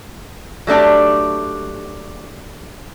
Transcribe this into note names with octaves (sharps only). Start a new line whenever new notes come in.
F#3 A3 D4 G4